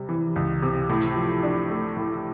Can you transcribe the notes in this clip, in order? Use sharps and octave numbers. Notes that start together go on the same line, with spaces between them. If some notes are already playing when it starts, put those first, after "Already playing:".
Already playing: C3 G3
E3
C#2
C3
A2
F3
D4
A3
A2